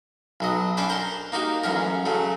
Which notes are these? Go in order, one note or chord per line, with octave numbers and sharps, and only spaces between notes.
B1 F#3 D#5
C#4 D4 B4 C5 D5
A#4 C5 C6
A#3 D#4 F#4 G4
A1 F#2 C#4 A#4
C#3 F#3 A3